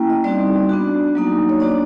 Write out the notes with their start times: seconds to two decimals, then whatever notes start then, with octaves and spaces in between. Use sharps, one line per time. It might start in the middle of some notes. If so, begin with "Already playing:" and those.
Already playing: A#3 C#4 E4 G5
0.10 D#5
0.24 G3 C4 D#4 F#4 D5
0.69 B3 D4 F#4
1.15 F#3 A#3 D#4
1.49 C#5
1.60 A#3 D4 F#4 D5